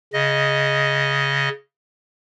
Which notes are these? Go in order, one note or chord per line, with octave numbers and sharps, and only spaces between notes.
C#3 D#5